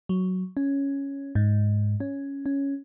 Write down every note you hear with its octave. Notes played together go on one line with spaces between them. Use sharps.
F#3
C#4
G#2
C#4
C#4